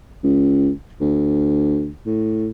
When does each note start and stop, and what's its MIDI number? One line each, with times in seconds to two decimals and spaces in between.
0.24 0.71 37
1.01 1.90 38
2.06 2.49 45